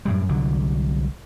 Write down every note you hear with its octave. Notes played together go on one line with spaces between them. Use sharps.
F#2 A2 G3
C2 D3 F#3